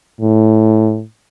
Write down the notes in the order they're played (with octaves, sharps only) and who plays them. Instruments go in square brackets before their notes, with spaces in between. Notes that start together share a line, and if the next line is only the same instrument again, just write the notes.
[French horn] A2